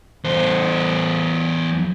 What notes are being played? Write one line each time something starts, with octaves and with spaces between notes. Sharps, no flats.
E2 C5